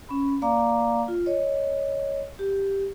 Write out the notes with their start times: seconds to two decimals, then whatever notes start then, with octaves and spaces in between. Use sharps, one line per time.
0.09 C#4 B5
0.42 A#3 D5 F5 A#5 D6
1.08 F4
1.26 C#5 D#5
2.39 G4